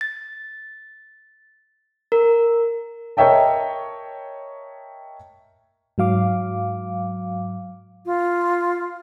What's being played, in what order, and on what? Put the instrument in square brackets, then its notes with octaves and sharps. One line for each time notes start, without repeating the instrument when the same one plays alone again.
[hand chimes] A6
A#4
[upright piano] A#4 C#5 D#5 E5 G5 A5
[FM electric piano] G#2 F#3 F5 D6
[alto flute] F4